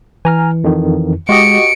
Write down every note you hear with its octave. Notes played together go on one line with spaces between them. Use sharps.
E3 G#5 A#5 F6
F2 D#3
G#3 F#4 G4 D#5 C#7 D7